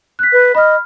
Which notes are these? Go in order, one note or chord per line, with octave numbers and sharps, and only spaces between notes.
F#6 B6
B4
D#5 B5 F6